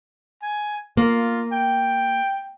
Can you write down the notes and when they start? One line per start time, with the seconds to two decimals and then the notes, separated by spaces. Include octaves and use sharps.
0.42 G#5
0.97 A#3 F4
1.52 G5